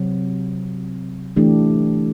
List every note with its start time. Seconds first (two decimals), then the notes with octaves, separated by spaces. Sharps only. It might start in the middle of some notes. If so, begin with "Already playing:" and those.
Already playing: C3 F#3 C4
1.36 E3 A3 D4 G4